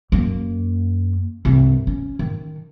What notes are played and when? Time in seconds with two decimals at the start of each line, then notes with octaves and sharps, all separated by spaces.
0.12 F#2 A#3
1.45 C2 G2
1.87 C#4
2.19 D#3